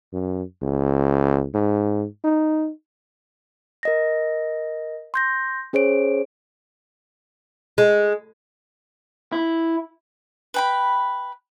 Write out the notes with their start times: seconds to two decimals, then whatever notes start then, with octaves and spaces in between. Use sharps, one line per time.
0.13 F#2
0.62 C#2
1.54 G#2
2.24 D#4
3.83 A#4 D#5 A#6
5.14 C6 G6 A#6
5.73 C#4 G#4 C5 C#5 D7
7.78 G#3
9.32 E4
10.54 B4 G5 B5